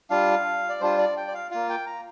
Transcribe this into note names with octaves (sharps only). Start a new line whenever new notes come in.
G3 D4 F4 F5
D5
G3 D4 F4 C5
D5
G5
D5
F5
A#3 F4 F5
G5
A#5